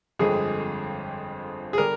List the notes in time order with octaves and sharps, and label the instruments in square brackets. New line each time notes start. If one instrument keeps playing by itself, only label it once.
[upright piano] G1 F2 D3 G#3 C4 [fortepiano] G#4
[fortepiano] G#4
[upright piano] D3 G3 D4 [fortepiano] A#4